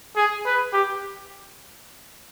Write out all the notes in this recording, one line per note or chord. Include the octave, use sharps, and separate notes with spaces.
G#4
B4
G4